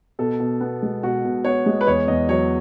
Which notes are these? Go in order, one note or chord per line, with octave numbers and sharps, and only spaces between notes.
B2 A4
B2
B3
G#3
B2 F#4
B2
B3 C#5
G#3
B4
E2 C#5
E2 D#5
F#3 C#5